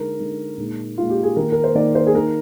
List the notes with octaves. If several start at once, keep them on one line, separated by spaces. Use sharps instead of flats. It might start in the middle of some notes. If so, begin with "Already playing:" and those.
Already playing: D3 G#3 D#4 A#4
D3 G#3 D#4
A#2 G#3 D#4
A#2 G#3 D#4 F4
G4
G#4
D#3 A#3 D#4 A#4
A#4
C5
D#3 A#3 D#4 D5
C5
G#4
D#3 A#3 D#4 A#4